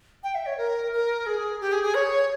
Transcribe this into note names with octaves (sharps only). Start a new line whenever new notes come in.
G5
E5
C#5
A#4
A#4
G#4
G4
G#4
G#4
C#5